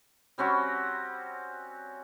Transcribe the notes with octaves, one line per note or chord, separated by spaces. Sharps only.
G3 C4 C#4 F#4